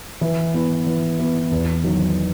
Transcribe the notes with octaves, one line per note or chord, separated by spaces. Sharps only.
E3
B3 E4
E3
B3 E4
E2
D#3 F#3